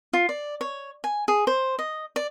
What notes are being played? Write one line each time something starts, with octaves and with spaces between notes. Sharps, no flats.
F4
D5
C#5
G#5
G#4
C5
D#5
D5